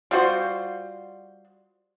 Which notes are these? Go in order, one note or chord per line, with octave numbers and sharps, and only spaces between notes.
G3 F4 F#4 C5